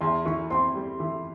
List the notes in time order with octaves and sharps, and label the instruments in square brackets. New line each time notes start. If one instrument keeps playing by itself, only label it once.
[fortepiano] E2 [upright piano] C6
[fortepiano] E3 [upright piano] C#6
[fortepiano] C4 [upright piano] C6
[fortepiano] G3
E3